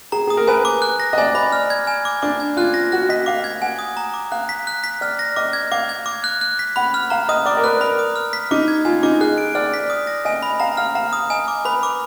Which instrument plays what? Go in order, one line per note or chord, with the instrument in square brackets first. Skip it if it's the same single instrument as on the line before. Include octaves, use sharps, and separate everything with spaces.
[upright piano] G#4 [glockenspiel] A#5
[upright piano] G#4 [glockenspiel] D#6
[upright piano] A#4
[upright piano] B4 [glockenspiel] G#5
[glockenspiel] D6
F#6
A#6
[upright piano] D#5
[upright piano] D5 [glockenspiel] G#5
[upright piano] D5 [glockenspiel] B5
[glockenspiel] F6
G#6
G#5
D6
[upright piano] D4 [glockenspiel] D6
[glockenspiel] G#6
[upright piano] F4 [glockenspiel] F#6
[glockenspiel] A#6
[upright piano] F#4 [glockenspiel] F#6
[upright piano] D#5 [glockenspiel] B6
[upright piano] F5 [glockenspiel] D6
[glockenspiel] G#6
[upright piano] F#5 [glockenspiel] G#5
[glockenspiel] D#6
A#5
D6
[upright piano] F5 [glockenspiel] F#6
[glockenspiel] B6
F#6
B6
[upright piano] D5 [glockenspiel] F6
[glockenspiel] A#6
[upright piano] D#5 [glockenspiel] D6
[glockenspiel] G#6
[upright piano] F5 [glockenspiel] D6
[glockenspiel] G#6
D6
F#6
F#6
B6
[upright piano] F#5 [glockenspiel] B5
[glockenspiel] F6
[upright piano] F5 [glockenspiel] A#5
[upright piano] D#5 [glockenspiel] D#6
[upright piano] D5 [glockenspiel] D6
[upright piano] A#4
[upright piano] B4 [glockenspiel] F#6
[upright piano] A#4 [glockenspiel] B5
[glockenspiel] D#6
F6
B6
[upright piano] D#4 [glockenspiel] D6
[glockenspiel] G#6
[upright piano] F4 [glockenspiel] G#5
[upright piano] D#4 [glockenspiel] D6
[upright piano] G#4 [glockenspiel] F#6
[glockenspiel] D7
[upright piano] D5 [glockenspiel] F6
[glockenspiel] B6
D#6
A#6
[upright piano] D#5 [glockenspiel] G#5
[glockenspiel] B5
[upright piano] F5 [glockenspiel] A#5
[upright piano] F5 [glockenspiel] F6
[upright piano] F5 [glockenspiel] A#5
[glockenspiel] D#6
[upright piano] D#5 [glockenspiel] G#5
[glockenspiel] D6
[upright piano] B4 [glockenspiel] B5
[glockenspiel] D6